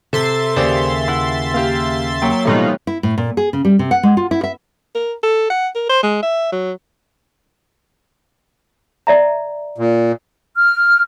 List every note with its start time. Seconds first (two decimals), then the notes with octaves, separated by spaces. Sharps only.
0.13 C3 A4 E5 C6 A6
0.56 D#2 C#3 G4 C5 D5
1.08 E4 F#5 E6
1.54 A#3 G4 F5
2.22 F#3 A#3 C#5 G5
2.45 B2 E3 F3 G3 A3 D#4 F4 F#6
2.87 E4
3.03 A2
3.18 A#2
3.37 G#4
3.53 C#3
3.65 G3
3.79 C3
3.91 F#5
4.03 G#3
4.17 F4
4.31 E4
4.44 E5
4.95 A#4
5.23 A4
5.50 F#5
5.75 A#4
5.89 C5
6.03 G#3
6.22 E5
6.52 F#3
9.07 D5 E5 A#5
9.78 A#2
10.58 F6